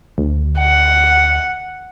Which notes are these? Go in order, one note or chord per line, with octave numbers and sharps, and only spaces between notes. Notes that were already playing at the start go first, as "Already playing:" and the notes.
D2
F#5